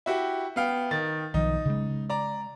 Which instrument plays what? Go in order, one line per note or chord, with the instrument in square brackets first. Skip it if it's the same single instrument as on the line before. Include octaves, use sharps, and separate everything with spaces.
[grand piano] E4 F#4 G4
B3 F5 G5
D#3 A6
[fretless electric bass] B1 D#3 F3 [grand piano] D#4
[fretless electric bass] C#3 G#3
[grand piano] D5 A#5